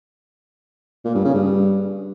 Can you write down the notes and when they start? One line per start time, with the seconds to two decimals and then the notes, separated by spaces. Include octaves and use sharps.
1.05 A#2
1.15 G2
1.24 C#3
1.34 G2